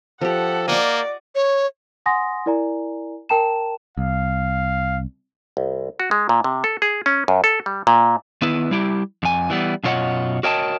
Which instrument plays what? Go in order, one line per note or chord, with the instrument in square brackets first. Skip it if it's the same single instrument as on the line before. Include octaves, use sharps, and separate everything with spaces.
[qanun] F3 G4 [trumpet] A4 [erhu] F#5
[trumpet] A#3 [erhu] D5 [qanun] D#5 F#5 C#6
[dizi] C#5
[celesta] F#5 G#5 C6 D#6 A#6
E4 A#4 D5 G#5 A#5
A#4 G5 A5 A#5 E7
[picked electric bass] C2 [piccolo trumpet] F5
[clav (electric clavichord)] C2
F#4
G#3
A#2
C3
A4
G#4
C#4
F#2
A4
G3
A#2
[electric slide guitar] D#3 B3 E4 B4
G3 E4 G4
F2 G#5
E3 G3 B3
F#2 B2 F4 C#5 D#5 F#5
F#4 A#4 C#5 D#5 G5 A5